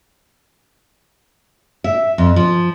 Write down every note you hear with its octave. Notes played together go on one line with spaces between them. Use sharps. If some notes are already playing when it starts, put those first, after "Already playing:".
E5
F2
F3